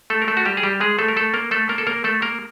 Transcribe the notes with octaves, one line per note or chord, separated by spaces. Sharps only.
A3 A4
A#4
A3 A4
F#4
G3 G4
G#4
G3 G4
G#3 G#4
A3 A4
A#4
A3 A4
A#3 A#4
A3 A4
A#3 A#4
A4
A#3 A#4
A3 A4
A#3 A#4